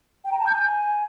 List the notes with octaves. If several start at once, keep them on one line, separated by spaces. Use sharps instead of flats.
G5
A#5
A5
G6
G#5